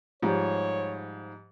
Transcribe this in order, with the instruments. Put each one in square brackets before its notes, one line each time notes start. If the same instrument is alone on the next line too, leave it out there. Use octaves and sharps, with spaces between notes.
[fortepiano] G#2 F3 G3 [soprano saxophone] C#5